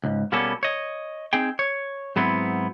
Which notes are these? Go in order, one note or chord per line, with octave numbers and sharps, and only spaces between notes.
C#2 G#2
B2 G3 A#3 B3 C#4 A4
C#5 D#5
C4 D#4 G#4 G5
C#5
G#2 F#3 B3 C4 E4